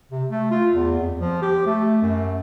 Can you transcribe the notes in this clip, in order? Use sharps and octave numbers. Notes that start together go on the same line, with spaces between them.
C3
A3
F4
E2
F2
F3
G4
A3
F#2